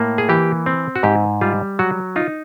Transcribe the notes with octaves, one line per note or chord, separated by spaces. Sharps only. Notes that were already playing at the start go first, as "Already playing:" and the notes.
Already playing: A2 A#3
G#4
E3 G4
C4
F#4
G#2 G4
G3 F4
F#3 F#4
D#4 F4